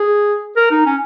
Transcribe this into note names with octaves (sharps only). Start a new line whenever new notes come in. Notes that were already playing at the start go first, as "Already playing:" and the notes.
Already playing: G#4
A#4
D#4
C#4